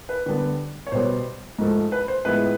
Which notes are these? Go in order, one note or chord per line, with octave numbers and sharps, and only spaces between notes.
B4
D3 G3 B3
C#5
B2 G3 B3 C5
G#2 F3 A3
B4
C5
A2 F3 G#3 B3 E4 B4